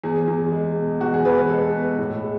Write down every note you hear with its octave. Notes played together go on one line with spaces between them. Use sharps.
E2 G#4
E2
G#3
B2
E2 F#4
G#4
E2 B4
B4
G#3 A4
B2
A2
G#3